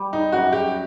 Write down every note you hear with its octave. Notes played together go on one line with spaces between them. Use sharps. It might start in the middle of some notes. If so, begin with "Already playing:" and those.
Already playing: G3
D#4
F#2 F#4
G4